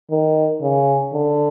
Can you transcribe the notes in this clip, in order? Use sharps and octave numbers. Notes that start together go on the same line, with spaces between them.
D#3
C#3
D3